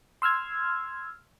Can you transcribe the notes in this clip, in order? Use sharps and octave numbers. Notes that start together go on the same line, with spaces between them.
C6 E6 F6 G#6